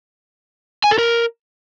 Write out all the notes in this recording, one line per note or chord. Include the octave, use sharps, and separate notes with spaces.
G#5
A4
A#4